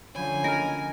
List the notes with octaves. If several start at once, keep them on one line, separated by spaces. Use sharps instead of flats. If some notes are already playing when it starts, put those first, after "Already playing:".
D3 F3 C#4 C#5 G#5 B5 G6
A#4 D#5 F6